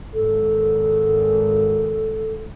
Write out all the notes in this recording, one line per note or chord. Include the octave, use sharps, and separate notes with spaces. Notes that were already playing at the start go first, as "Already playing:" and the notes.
G#1 A4